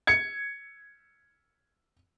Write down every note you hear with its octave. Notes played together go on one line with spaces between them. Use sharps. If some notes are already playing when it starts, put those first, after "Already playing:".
G#6 C#7